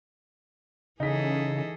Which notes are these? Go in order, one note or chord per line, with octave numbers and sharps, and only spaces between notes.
C#3 E3 D#4 G#4 A4 B6